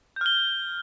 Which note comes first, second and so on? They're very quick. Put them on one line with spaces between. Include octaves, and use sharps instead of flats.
G6 F6 G7